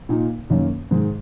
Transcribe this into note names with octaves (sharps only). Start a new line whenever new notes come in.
A#2 A#3 D#4
F#2 D#3 A#3 C#4
G#2 D#3 G#3